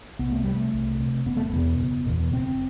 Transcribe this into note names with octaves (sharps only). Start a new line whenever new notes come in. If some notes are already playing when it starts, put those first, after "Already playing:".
C2 B3
A3
C3 G3
A3
C2
C3
F#1 B3
A3
B3
E2 B2
F#1
E2 B2
F#1 C4